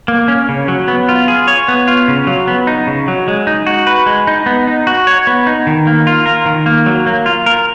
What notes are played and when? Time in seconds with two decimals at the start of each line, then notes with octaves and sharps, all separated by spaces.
0.08 A#3
0.28 C#4
0.49 C#3
0.68 F#3
0.88 B3
1.09 F4
1.28 G#4
1.48 C#5
1.68 B3
1.88 F4
2.08 C#3
2.27 F#3
2.47 B3
2.67 D#4
2.87 C#3
3.08 F#3
3.28 G#3
3.47 D#4
3.66 F#4
3.87 B4
4.06 G#3
4.27 D#4
4.46 B3
4.67 D#4
4.87 F#4
5.07 C#5
5.27 B3
5.47 D#4
5.67 D#3
5.87 A#3
6.07 F4
6.26 A#4
6.46 D#3
6.66 A#3
6.86 F#3
7.06 A#3
7.26 F4
7.46 A#4